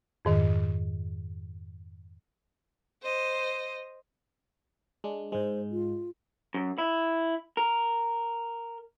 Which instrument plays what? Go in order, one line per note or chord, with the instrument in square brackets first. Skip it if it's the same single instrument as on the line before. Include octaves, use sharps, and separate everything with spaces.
[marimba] F2 G#2 D#3
[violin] C5 D#5
[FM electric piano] G#3 D4
[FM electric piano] G#2 G#3 [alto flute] C5
[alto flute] F4
[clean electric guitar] F#2
E4
A#4